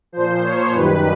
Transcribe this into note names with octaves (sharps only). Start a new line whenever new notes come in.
A#2 F3 C5
C#5
F#2 D#3 G3 B4